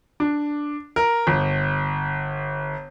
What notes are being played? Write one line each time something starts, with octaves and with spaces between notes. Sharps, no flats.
D4
A#4
G1